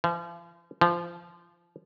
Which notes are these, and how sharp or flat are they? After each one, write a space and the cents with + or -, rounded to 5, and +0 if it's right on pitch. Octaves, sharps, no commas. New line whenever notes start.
F3 -40
F3 -20